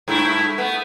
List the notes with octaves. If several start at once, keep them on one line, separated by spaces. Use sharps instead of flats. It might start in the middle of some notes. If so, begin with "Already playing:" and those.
G2 A3 E4
A3 B3